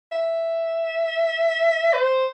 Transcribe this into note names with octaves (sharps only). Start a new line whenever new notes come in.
E5
C5